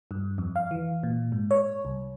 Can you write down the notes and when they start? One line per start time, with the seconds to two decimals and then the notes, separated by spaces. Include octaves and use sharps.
0.11 G2
0.38 F2
0.56 F5
0.71 E3
1.03 A#2
1.32 G#2
1.51 C#5
1.85 C2